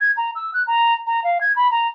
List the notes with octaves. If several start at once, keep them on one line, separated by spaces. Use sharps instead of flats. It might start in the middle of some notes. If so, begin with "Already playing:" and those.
G#6
A#5
E6
F#6
A#5
A#5
F5
G#6
B5
A#5